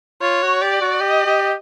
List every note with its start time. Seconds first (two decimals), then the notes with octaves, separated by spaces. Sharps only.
0.22 F4 C#5
0.42 F#4
0.61 G4 D5
0.82 F#4
1.00 G4 D#5
1.26 G4